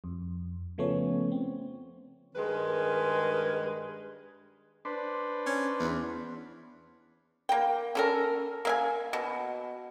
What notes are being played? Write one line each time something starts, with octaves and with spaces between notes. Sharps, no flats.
F2
C#3 F3 A3 B3 C#4 C#5
C4
G2 D#3 G#3 A#4 B4
D4 B4 C5
C#4
E2
A#3 G5
C#4 A4 A#4
A#3 E5 G#5
B2